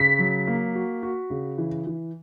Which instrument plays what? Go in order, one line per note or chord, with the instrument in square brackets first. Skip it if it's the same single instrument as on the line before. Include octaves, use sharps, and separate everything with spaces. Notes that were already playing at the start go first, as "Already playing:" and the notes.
Already playing: [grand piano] C#3 [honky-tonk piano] B6
[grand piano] F#3
A#3
F#4
F#4
C#3
E3
E3